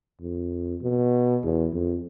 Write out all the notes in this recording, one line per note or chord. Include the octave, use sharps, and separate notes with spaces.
F2
B2
E2
F2